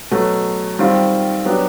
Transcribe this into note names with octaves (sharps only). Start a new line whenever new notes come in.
B2 F#3 A3
D#3 G3 C4 F4
F#3 B3 D4 G4